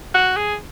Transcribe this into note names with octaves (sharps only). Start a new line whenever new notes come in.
F#4
G#4